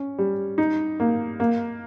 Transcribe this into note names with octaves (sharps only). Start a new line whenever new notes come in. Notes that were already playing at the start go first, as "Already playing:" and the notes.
Already playing: C#4
G3
D#4
A#3
A#3